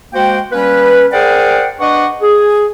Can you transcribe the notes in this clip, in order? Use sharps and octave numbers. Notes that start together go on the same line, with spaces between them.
G#3 A#3 F#4 C5 G5
G3 A#3 C#4 B4
G#4 A#4 C5 D5 F#5 G5
D4 B4 D#5 F#5 C#6
G#4